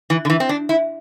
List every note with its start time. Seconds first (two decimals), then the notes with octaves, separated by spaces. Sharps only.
0.10 E3
0.25 D3
0.30 E3
0.40 C4
0.49 D4
0.69 E4